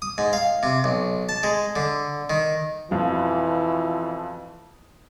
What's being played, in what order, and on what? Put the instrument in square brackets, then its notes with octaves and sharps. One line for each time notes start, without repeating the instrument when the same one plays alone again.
[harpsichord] D#6
G#2
F5
C3
B1
A5
G#3
D3
D#3
[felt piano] F2 B2 F3 [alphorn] E3